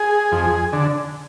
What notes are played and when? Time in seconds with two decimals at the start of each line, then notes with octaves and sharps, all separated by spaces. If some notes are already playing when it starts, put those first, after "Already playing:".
Already playing: G#4
0.32 F2
0.73 D3